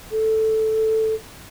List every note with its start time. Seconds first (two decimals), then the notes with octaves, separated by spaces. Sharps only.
0.11 A4